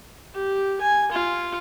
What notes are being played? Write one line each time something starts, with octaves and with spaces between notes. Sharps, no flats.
G4
G#5
F4